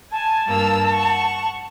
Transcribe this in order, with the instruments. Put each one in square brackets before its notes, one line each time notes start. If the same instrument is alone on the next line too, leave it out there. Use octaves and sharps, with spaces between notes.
[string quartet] G#5 [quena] A5
[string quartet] G2 A#3 E6
F#5 C#6